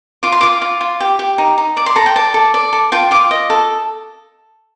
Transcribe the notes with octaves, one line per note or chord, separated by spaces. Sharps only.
F4 D6
C6
F4 D6
F4
F4
G4
G4
D#4
D#4
D5 D6
C6
A4 A#5
G5
D5 A5
A4
D5
A4
F4 G5
F4 D6
D#5
A4